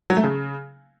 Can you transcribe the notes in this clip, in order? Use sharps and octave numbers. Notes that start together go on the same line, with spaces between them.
F#3
A3
C#3